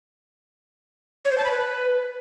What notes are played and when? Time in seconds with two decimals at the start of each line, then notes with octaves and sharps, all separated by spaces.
1.25 C#5
1.32 C5
1.38 A5
1.44 B5
1.51 B4